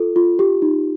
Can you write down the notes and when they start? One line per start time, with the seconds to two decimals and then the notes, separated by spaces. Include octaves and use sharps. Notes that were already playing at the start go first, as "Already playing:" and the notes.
Already playing: F4 A4
0.16 F4
0.39 G4
0.62 D#4